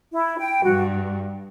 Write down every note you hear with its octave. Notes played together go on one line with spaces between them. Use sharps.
E4
G5
G2 F#4